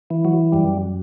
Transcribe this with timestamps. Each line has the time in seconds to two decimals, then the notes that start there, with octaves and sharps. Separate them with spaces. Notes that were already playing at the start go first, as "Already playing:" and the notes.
0.10 E3
0.25 F#3
0.52 F#2 G3